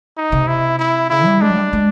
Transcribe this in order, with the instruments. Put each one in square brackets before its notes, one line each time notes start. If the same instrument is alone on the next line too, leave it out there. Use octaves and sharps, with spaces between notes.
[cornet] D#4
[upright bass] C3
[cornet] E4
E4
[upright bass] C#3 [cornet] E4
[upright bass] G3
[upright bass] G#3 [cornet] D4
[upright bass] F#3
G3
G#3